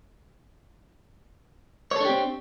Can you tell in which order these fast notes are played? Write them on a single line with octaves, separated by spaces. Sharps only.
C#5 A4 D4 G4 C4